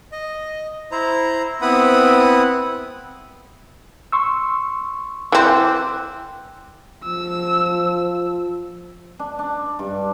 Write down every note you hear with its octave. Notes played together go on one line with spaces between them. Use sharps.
D#5
E4 C5 A#5
B3 C4 E4 F#5 B5 D#6
C6 C#6 E6
E3 C4 D6 E6 F#6
F3 E6
D4
D4
G2